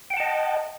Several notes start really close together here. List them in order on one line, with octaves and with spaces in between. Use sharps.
G5 F#5 A5 D#5